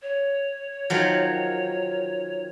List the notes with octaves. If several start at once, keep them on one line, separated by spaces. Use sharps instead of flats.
C#5
D#3 F3 F#3